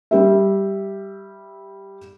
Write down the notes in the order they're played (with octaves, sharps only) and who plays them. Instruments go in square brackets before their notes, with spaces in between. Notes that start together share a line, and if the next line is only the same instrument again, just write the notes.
[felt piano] G3 G4 E5